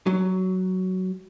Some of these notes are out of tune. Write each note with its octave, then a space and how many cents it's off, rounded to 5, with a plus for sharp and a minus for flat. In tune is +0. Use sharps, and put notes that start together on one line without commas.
F#3 +10